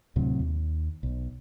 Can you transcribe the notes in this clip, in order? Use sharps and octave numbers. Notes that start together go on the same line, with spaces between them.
D2 A2 C3 F#3
D#2
B1